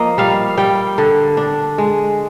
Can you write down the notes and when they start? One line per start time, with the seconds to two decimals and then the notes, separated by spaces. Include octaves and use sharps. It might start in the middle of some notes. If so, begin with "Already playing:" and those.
Already playing: F3 A#3 D#5
0.18 G3 F5
0.57 G3 G5
0.98 D3
1.37 D4
1.78 G#3